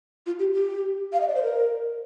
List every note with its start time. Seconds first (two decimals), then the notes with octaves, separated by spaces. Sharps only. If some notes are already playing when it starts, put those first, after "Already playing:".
0.26 F4
0.39 G4
0.53 G4
1.13 F5
1.20 D#5
1.28 D5
1.35 C5
1.43 A#4